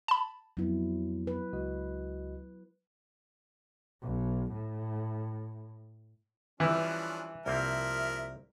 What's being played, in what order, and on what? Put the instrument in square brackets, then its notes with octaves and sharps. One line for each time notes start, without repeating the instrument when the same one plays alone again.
[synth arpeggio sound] A5 B5
[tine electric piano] F2 B3 [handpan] F#3 E4
[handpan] B4
[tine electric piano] C#2 F#4 D#5
[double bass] B1
A2
[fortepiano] E3 [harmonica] F3 C#4 D4 [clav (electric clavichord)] G3 E4 [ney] B4
[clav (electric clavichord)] C2 A#3 C4 [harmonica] F3 A#4 [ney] E5